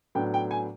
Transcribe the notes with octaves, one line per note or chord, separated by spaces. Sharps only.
A2 F#3 B3 D4 G5
G5
G#5